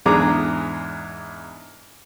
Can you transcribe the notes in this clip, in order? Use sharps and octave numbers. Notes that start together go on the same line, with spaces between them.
E2 G#2 D4 G#4 A#5 D6